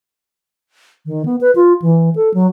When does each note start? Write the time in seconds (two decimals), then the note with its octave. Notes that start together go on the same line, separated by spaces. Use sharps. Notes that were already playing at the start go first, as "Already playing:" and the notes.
1.06 D#3
1.25 B3
1.41 B4
1.55 F4
1.82 E3
2.16 A4
2.34 F#3